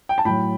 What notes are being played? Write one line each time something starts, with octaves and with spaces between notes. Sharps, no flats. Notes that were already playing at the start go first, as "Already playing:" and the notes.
G5
A5
A2 F#3 G5 B5